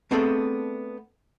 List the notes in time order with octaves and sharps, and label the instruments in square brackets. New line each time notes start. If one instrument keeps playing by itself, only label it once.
[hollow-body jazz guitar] A3 B3 C4 D4 G#4 A4